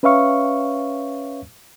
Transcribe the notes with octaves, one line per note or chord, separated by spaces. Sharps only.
C#4 B4 C#5 E5 F5 C#6